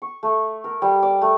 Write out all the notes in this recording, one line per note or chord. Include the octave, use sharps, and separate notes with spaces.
C#6
A3
A#4
G3
D5
A3